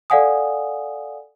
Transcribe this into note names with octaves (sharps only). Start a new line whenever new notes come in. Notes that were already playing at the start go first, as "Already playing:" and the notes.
A4 D5 F5 F#5 G#5 D#6